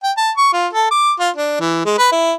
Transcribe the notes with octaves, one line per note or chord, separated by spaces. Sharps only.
G5
A5
C#6
F4
A4
D6
F4
D4
E3
G#3
B4
E4